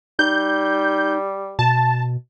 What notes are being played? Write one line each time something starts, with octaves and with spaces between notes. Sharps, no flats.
G3 D#4 G6
B2 A5